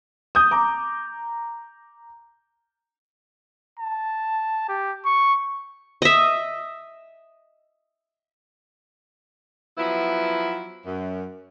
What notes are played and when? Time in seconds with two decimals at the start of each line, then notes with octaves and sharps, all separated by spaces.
0.35 D#6 G6
0.51 A#5 D6
3.80 A5
4.69 G4
5.05 C#6
6.02 D#5 E5
9.78 F3 F#3 B3 E4
10.85 F#2